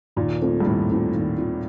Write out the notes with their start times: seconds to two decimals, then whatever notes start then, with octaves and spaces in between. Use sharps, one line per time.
0.16 D#2 A#2
0.41 D#3 A3 C4 F4
0.60 G2
0.65 D#2 A2
0.90 D#3 A3 C4 F4
1.14 D#2
1.38 D#3 A3 C4 F4